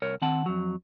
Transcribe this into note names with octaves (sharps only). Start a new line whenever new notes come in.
C2 A#4 C#5
D#3 C4 F#5 A5
F2 F#3